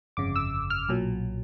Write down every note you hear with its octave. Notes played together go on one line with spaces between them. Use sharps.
G1 F2 C#3 D6
E6
F6
B1 A#2 F#3